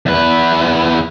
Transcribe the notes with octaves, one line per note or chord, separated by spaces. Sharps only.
E2 B4